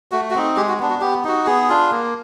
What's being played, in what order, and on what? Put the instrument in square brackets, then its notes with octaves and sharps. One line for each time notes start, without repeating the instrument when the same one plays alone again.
[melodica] A3 F#4
F#4
C4 D#4
G#3 G4
F#4
B3 D4
F#4
B3 G4
D#4 F#4
B3 G#4
D4 F4
A#3